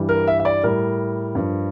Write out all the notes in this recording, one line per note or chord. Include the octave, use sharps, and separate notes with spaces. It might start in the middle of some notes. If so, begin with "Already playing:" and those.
Already playing: G2 E3 G3
A#4
E5
E5
D5
A2 G3 A#4
G2 F3